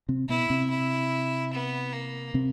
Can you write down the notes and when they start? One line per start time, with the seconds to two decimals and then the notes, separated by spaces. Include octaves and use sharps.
0.09 C3 C4
0.29 B2 B3 E4
0.50 C3 C4
0.71 E4
1.53 B3
1.93 A#3
2.34 C3 C4